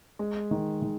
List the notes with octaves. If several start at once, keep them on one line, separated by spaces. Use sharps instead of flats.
G#3
D#3
D#3